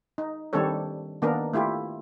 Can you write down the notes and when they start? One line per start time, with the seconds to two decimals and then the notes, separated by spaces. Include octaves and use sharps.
0.18 D#4
0.53 D#3 G3 C4 D4 A4 C#5
1.22 D#3 A#3 B3 D4 A#4
1.53 A3 E4 F4 G4